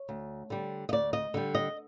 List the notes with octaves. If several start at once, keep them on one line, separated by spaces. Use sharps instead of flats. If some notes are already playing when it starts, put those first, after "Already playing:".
Already playing: C#5
D2
D3 G3
D#5
D2 D5
D#5
D3 G3
D#5